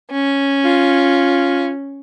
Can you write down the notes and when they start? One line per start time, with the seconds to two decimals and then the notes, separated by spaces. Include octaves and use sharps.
0.11 C#4
0.65 F4